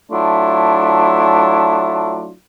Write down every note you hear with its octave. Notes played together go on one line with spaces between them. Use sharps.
F#3 A3 D4 E4 F4